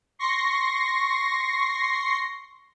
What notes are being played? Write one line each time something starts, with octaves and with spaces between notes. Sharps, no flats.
C6 C#6 A#6 C7